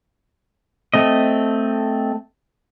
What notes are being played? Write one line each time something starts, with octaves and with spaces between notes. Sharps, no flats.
A3 C4 D#5